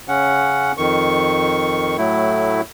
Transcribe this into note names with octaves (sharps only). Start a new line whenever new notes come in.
C#3 C#4 F#5
F2 D#3 C#6
A2 F#3 A3 E4